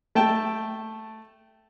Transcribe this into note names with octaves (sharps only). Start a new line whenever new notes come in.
A3 G5 A5